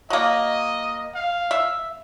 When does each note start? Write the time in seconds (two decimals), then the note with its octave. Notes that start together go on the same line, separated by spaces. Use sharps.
0.10 F#3 A#3 D#5
1.15 F5
1.51 E5